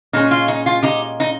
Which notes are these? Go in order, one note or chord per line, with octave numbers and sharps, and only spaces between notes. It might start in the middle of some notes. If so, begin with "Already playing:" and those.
A#2 G#3 C#4 D#4
F4
D#4
F4
D#4 G4
D#4